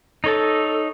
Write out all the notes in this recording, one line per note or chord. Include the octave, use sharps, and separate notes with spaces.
D#4 A4 C#5 A5